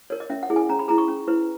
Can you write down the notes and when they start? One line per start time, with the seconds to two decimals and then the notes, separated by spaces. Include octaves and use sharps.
0.10 A#4 C#5
0.20 D#5
0.30 C#4 E5
0.43 F#5
0.50 E4 G#4
0.56 G#5
0.69 C#4 A#5
0.79 B5
0.88 E4 G#4 A#5
0.98 C#6
1.08 C#4
1.28 E4 B4